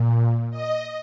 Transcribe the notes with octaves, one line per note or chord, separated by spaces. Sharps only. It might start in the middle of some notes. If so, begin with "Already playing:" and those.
Already playing: A#2
D#5